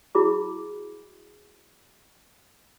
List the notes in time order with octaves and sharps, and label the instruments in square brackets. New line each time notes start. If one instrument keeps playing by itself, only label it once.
[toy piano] E4 F#4 G#4 B5 D6